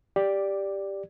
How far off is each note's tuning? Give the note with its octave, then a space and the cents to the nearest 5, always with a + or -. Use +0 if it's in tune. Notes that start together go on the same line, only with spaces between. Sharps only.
G4 +5 D5 +0